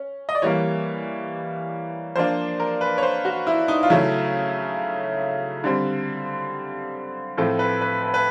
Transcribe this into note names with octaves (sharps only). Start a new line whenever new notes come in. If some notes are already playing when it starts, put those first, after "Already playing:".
Already playing: C#4
D#5
D5
E3 G3 A#3 C#5
F3 A#3 D4 C5
A#4
B4
C#5
C5
F#4
E4
D#4
F4
C#3 F#3 A3 C#4 E4
D3 G3 C4
A2 F3 A3 C4 A4
B4
B4
B4
B4